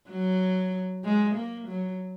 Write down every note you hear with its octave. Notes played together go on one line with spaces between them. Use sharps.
F#3
G#3
A#3
F#3